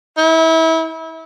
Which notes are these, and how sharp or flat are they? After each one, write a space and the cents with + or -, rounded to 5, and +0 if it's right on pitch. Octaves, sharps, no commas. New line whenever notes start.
E4 -30